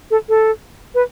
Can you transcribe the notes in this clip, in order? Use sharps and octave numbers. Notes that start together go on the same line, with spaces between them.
A4
A4
B4